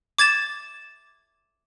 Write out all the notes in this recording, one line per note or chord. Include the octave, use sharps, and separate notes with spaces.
D6 G#6 A6 E7